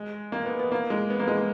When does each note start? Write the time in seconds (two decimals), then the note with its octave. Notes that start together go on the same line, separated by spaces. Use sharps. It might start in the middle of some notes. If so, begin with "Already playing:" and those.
Already playing: G#3
0.32 A#3
0.45 B3
0.59 B3
0.72 A#3
0.90 G#3
1.10 B3
1.20 A#3
1.28 G#3
1.37 A#3